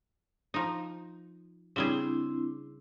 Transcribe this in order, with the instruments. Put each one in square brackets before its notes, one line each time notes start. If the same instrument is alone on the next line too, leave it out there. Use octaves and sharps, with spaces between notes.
[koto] F3 D#4
[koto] C#3 G3 G#4 [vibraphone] C4 D4 E4